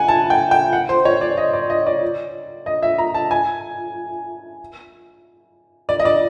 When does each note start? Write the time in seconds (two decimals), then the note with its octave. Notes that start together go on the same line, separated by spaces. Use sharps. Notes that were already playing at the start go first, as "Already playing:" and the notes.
Already playing: F#5 G#5
0.08 A5
0.30 G5
0.51 G5
0.73 F#5
0.89 C5
1.05 C#5
1.21 D5
1.37 D#5
1.53 D5
1.70 D#5
1.87 D5
2.66 D#5
2.83 E5
2.98 A#5
3.14 A5
3.31 G#5
5.89 D5
6.00 D#5
6.05 D5